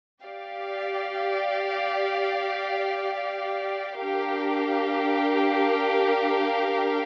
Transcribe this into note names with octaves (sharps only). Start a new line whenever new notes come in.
G4 D5 F5
D4 G4 A#4 F5